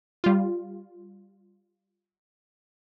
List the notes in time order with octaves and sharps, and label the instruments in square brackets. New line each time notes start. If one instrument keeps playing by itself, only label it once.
[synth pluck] G3 F4